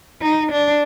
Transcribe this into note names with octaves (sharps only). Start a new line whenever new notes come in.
D#4
D4